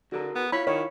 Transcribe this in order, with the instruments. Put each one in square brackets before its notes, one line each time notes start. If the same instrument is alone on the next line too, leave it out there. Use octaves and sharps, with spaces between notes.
[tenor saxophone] D3 [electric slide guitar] F#4 G#4 A#4
[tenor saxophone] B3
[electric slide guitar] E4 F4 [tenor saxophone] C#5 [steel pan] B5
[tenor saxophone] D#3 [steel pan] C#5